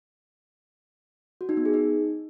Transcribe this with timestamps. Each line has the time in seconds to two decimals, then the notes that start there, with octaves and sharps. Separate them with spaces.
1.41 F#4
1.49 D#4
1.57 B3
1.65 G#4
1.74 D#4